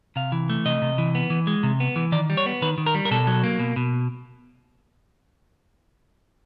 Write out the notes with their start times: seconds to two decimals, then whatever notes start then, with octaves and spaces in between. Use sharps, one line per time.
0.16 C3 F5
0.32 E3
0.49 A3
0.65 C3 D#5
0.82 C3
0.98 E3
1.15 B3
1.30 E3
1.47 G#3
1.63 C3
1.80 B3
1.96 E3
2.12 D#3 D5
2.30 G3
2.37 C#5
2.46 B3
2.62 D#3 B4
2.78 D#3
2.86 A#4
2.95 G3
3.05 A#4
3.11 B2 A4
3.27 F#3
3.44 A#3
3.60 B2
3.76 B2